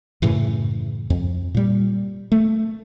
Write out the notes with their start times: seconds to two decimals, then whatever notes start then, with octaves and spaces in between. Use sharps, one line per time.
0.22 F#2 A2 C#3 E3
1.10 F2
1.55 A#2 G3
2.32 A3